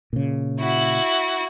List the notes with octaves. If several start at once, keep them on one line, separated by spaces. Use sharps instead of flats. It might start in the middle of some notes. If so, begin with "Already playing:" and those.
A#2 C#3
E4 F#4